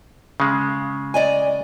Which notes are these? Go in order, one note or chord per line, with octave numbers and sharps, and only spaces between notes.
C#3 G#3
D5 D#5 G#5